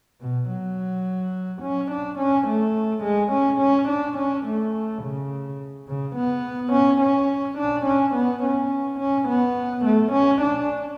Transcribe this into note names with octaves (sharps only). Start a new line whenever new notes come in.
B2
F#3
C#4
D4
C#4
A3
G#3
C#4
C#4
D4
C#4
A3
C#3
C#3
B3
C#4
C#4
D4
C#4
B3
C#4
C#4
B3
A3
C#4
D4